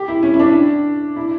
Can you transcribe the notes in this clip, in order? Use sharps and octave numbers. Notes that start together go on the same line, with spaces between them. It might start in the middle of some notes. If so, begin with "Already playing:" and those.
Already playing: G4
E4
C#4
E4
D4
E4